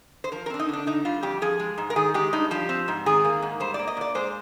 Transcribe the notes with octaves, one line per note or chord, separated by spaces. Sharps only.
C5
F3 A#4
A#4
C4 D4
D#4
D3 D4
D3 D#4
G3 F4
F2 G4
F3 G#4
G#3
G#2
A#4
D#3 G#4
G#3 G4
G2 D#4
F3 G4
C4
G#2
D#3 G#4
A#3
G#2
G3 C5
D5
A#3
D#5
A#2 D5
G#3 C5